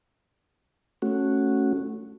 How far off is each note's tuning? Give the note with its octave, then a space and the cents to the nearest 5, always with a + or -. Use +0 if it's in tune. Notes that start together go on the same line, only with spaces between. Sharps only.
A3 +0 C#4 -10 F#4 +0